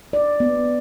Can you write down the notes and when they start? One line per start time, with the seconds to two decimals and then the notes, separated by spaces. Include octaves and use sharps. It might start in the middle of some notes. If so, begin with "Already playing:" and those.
0.13 D5
0.40 B3